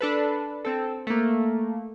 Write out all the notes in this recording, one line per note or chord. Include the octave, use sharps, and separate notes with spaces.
D4 A4 B4
C4 A4
A3 A#3